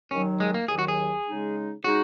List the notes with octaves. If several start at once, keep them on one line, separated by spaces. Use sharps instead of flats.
D#2 D#3 F#3 C#4
G#3
A#3
D#2 D#3 F#3 G#4
F#4
G#4
C#3 G#3 D#4
C#3 G#3 D#4 F#4